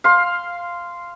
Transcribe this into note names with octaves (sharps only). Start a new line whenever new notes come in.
F5 C6